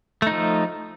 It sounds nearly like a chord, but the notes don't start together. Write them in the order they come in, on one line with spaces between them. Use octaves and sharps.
A3 D#4 F3